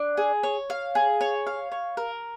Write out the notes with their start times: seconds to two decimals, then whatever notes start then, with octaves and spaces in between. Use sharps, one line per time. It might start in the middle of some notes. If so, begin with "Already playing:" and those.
Already playing: D4
0.17 G#4
0.43 C#5
0.70 F5
0.95 G#4
1.21 C#5
1.47 F5
1.72 C#5
1.97 A#4